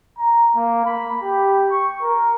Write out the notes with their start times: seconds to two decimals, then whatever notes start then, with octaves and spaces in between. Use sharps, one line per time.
0.19 A#5
0.56 A#3
0.85 B5
1.22 G4
1.70 C#6
2.02 A#4